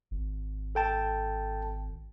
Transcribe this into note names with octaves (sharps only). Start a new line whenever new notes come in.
G#1
A4 G5 A5